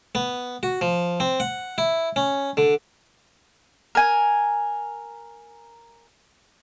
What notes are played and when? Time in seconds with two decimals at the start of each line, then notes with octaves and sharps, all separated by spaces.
0.15 B3
0.63 F#4
0.81 F3
1.20 C4
1.40 F#5
1.78 E4
2.16 C#4
2.57 D3
3.95 A#4 G#5